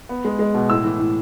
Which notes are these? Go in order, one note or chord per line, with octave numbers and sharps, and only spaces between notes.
B3
G#3
G#3
B2
A2 E6
E3
A2